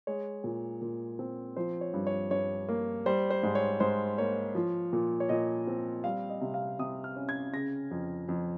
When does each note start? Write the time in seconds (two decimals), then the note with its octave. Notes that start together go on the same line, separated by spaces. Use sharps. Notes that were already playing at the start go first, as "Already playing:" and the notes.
0.07 G#3 C#5
0.44 A#2
0.82 A#2
1.19 C4
1.56 F3 C5
1.81 C#5
1.94 G2
2.07 C#5
2.31 G2 C#5
2.69 A#3
3.06 G3 C5
3.30 C5
3.43 G#2
3.55 C#5
3.80 G#2 C5
4.18 A#3 C#5
4.55 F3
4.93 A#2
5.20 C#5
5.29 A#2 D#5
5.67 C4
6.04 G3 F5
6.29 D#5
6.41 C3
6.54 F5
6.79 C3 D#6
7.04 F6
7.16 C#4
7.29 G#6
7.53 C#3 A#6
7.91 F2
8.29 F2